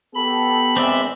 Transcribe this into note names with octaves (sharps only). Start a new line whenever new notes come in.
B3 G4 A4 B5
A#1 E2 G#3 C4 D5 E5